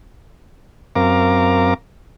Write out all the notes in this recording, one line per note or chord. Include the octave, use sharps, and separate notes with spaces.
F#2 C4 A#4 F5 A#5 D6